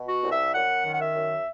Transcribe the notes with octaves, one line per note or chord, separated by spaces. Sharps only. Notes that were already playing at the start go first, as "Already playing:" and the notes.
Already playing: B2
F#4
C2
E5
F#2 F#5
D#3
F#5
E5
F#2